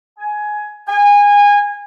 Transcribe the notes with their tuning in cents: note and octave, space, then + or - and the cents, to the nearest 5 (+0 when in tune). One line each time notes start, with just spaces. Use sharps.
G#5 +15
G#5 -25